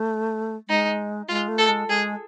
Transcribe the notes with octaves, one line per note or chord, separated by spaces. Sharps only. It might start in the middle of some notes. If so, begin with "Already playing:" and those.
Already playing: A3
G#3 D#4
G#3 F4
A3
A4
G#3
G#3 G#4